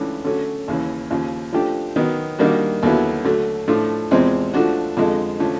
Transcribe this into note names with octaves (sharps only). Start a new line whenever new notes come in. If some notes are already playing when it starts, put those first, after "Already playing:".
Already playing: C#2 C#3 E3 A3 D4
D3 F#3 A3 C#4
D#2 C#3 E3
D#2 C#3 F3
F3 A3 D4 G4
D#3 F#3 B3
D#3 G3 A#3 D4 F#4
D#2 D3 F#3 B3 E4
D3 F#3 A3
A2 F3 A3 D4 F4
E2 C3 F3 G#3 C4
F3 A3 D4 F#4
F2 D3 F3 G#3
D3 F3 A3 C#4